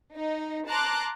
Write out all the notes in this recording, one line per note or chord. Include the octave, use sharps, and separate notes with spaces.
D#4
A5 A#5 C6 D6 F#6